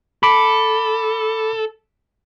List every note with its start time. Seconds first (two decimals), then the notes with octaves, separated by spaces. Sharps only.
0.23 A4 B5 D6